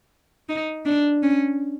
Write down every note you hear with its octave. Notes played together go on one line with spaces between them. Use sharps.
D#4
D4
C#4